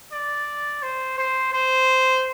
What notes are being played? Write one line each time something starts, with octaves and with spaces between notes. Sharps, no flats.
D5
C5
C5
C5